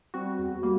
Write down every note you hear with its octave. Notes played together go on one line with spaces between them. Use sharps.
G3 C4 F#4
E2
G3 A#3